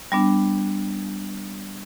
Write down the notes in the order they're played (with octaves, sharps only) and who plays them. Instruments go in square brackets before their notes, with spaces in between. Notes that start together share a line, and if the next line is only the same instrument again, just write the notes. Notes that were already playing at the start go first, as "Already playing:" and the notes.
[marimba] G3 B3 D4